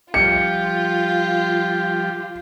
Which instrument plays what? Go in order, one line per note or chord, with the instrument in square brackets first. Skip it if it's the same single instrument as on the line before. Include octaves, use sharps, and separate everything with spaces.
[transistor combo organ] F3 G3 G4 [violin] F4 [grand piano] C#7